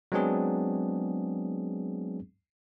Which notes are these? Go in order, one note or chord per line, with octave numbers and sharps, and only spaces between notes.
F#3 G#3 B3 C4 D4 G#4